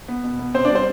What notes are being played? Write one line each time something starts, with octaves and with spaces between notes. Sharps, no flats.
B3
B2
B3
C3 C4 C5
D4 D5
G3 C4 C5